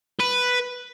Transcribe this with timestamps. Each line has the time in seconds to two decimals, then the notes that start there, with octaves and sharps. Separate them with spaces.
0.20 B4